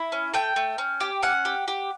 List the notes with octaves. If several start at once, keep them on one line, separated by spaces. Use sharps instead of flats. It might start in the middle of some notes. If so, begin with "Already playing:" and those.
Already playing: E4
C#4
A3 G5
A3
C#4
G4
C#4 F#5
G4
G4